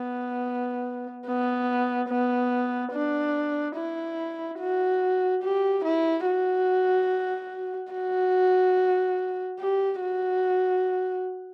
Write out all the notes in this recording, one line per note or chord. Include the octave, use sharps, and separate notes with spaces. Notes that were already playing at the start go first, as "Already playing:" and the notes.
Already playing: B3
B3
B3
D4
E4
F#4
G4
E4
F#4
F#4
G4
F#4